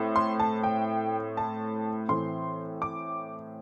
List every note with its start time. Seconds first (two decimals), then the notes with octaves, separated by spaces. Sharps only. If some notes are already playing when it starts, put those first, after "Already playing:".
Already playing: A2 A3 C4
0.16 C6
0.39 A5
0.64 G5
1.37 A5
2.09 A2 E3 A3 C4 C6
2.82 D6